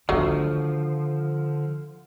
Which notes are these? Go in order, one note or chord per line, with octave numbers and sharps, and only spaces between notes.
D3 D#3 F3 F#3 A3 D4